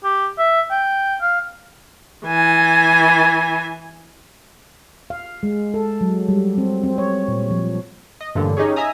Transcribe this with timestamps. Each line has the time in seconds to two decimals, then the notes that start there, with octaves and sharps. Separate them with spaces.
0.04 G4
0.38 E5
0.71 G5
1.22 F5
2.25 E3 G#5
5.10 F5
5.43 G#3
5.74 A4
6.01 F#3
6.29 G3
6.58 C4
6.83 C4
6.98 C#5
7.28 A#2
7.51 F3
8.21 D#5
8.35 A1 G2 A#2 D3
8.57 C#4 D#4 G4 G#4 C#5
8.76 D#5 E5 G#5 A#5 D#6